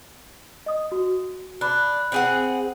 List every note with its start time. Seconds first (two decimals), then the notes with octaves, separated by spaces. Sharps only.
0.66 D#5 D#6
0.92 F#4
1.61 D4 B5 F#6
2.12 C4 G#4 F#5